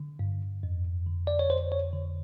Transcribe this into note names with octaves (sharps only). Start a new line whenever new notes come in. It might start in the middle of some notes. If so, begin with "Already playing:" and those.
Already playing: D3
G2
F2
D3
D5
C#5
F2 C5
C#5
D3